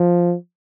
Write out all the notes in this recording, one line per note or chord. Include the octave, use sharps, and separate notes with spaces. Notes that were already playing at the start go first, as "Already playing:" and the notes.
Already playing: F3